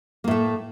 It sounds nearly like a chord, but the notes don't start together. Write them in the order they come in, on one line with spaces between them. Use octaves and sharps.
A#3 A2 A3